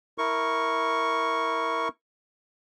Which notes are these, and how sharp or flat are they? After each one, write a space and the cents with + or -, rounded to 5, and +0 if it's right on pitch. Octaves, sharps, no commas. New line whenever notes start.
E4 -15 A#4 +0 C#6 +0